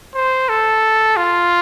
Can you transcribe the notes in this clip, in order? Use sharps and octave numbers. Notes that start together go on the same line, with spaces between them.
C5
A4
F4